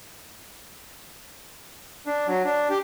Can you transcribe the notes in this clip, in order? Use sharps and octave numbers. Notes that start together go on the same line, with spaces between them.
D4
F#3
D4
G4